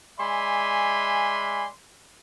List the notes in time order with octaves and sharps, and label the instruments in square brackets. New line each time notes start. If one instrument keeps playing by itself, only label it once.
[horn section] G#3 D5 E5 G#5 B5 C6